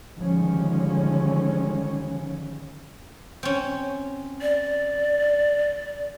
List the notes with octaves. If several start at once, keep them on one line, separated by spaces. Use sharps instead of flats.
D3 D#3 F3 G3 G#3 C#4
C4 C#4
D5